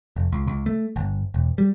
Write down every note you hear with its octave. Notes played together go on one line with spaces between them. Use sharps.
F1
C#2
C#2
A3
G1
E1
G3